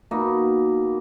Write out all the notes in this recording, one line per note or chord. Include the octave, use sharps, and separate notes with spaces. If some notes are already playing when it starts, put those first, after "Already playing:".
B2 A#3 D#4